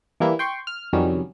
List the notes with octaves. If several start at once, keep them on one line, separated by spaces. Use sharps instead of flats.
E3 G3 A#3 E4
G5 C6 C#6
F6
F2 C3 D#3 F#3 G3 C#4